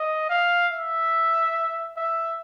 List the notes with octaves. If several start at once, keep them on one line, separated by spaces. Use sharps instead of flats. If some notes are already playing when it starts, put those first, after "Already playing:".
Already playing: D#5
F5
E5
E5